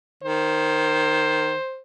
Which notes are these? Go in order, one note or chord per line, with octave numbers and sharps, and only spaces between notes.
D#3 C5